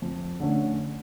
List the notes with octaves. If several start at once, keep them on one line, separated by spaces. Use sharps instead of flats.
F2
D3 A3 C#4